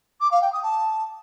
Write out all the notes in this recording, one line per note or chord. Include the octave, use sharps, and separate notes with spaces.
D6
F5
G5
D#6
A5